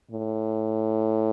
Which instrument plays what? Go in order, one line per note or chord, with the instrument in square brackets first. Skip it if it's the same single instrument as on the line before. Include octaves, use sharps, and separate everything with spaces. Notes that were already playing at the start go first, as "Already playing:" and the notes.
[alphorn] A2